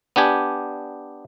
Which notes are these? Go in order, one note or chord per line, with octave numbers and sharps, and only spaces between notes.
B3 D4 G4 G#5